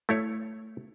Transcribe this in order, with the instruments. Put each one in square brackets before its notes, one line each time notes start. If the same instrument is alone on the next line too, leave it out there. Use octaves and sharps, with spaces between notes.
[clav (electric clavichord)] A3 E4 C#5